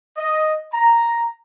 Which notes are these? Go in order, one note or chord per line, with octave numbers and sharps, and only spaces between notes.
D#5
A#5